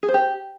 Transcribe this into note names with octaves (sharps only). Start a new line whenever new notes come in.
G#4
C5
G4